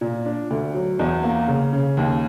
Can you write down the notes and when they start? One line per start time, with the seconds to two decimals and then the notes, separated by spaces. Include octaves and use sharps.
0.01 A#2
0.25 D4
0.50 D2
0.74 F#3
0.99 E2
1.23 A#3
1.48 C#3
1.73 C#3
1.97 D#2